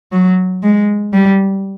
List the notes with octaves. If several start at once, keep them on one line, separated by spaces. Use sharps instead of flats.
F#3
G#3
G3